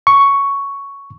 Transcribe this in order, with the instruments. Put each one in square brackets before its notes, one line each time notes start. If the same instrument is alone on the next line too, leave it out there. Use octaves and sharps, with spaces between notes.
[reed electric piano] C#6